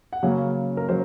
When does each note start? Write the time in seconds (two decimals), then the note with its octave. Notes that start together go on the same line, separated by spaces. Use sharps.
0.13 F#5
0.23 C#3 F#3 A#3 C#4 F5
0.77 A#4
0.89 C#3 F#3 C5